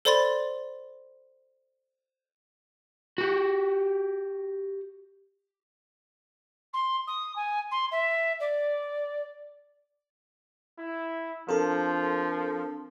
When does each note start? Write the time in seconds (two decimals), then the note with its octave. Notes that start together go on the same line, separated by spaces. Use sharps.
0.05 A4 C5 D5 B5 C6 A6
3.18 F#4 G4
6.73 C6
7.07 D#6
7.36 G#5
7.71 C6
7.91 E5
8.40 D5
10.78 E4
11.49 F3 C4 D4 A4 A#4 A5